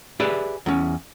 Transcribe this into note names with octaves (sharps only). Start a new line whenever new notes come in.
G4 G#4 B4 D5 E5
E2 C#4